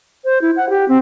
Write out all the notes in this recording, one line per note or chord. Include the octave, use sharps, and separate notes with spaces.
C5
E4
F#5
G4
C4